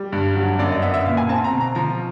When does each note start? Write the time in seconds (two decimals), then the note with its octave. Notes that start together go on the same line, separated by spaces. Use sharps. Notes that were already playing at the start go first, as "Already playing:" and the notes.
Already playing: G3
0.12 G2
0.35 F#3
0.59 F#2 D5
0.71 D#5
0.82 B3 E5
0.94 E5
1.06 A#2 F5
1.17 G#5
1.29 C4 A5
1.44 A#5
1.53 B2
1.60 A#5
1.75 F3 A#5